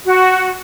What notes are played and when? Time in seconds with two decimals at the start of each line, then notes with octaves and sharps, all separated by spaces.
0.06 F#4